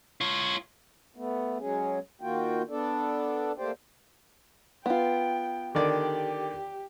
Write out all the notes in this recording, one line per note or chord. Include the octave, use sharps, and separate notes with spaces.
F4 C#5
A3 B3
F#3 G#3 C#4 G#4
D#3 A#3 F4 F#4 G5
B3 D4 A4 D5
A3 A#3 G4 C5 D5 G5
B3 F4 G5
D3 D#3 G4 D5